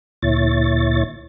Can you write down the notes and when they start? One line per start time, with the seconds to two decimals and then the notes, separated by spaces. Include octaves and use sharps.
0.22 D2 A#2 E4 C#5 A6